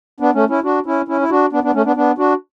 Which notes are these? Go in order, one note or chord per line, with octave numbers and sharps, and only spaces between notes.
B3 D4
A3 C#4
C#4 E4
D4 F#4
C#4 E4
C#4 E4
E4
D4 F#4
B3 D4
B3 D4
A3 C#4
B3 D4
B3 D4
D4 F#4